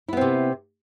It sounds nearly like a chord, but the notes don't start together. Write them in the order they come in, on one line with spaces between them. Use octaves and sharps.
E4 B3 C4 C3